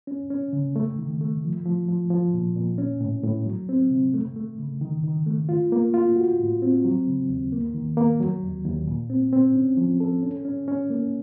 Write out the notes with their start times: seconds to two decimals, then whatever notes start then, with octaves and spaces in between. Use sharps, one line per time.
0.07 C#4
0.30 C#4
0.53 C#3
0.76 A3
0.99 D#3
1.21 A3
1.43 F3
1.65 F3
1.88 F3
2.10 F3
2.34 A#2
2.56 A#2
2.78 C#4
3.01 A2
3.23 A2
3.46 F#3
3.69 C4
3.91 C3
4.14 A3
4.36 A3
4.59 C#3
4.81 D#3
5.04 D#3
5.26 A3
5.49 F4
5.72 A#3
5.94 F4
6.16 F#4
6.39 A2
6.62 C4
6.85 F#3
7.07 C#3
7.29 D#2
7.52 A#3
7.74 D#3
7.97 A#3
8.20 F#3
8.43 D#2
8.65 D#2
8.87 A#2
9.10 C4
9.32 C4
9.55 C#4
9.77 F3
10.00 A4
10.23 C#4
10.45 C#4
10.68 C#4
10.90 A#3